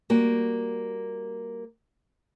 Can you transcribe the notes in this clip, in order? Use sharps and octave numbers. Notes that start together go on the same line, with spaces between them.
G3 A#3 F#4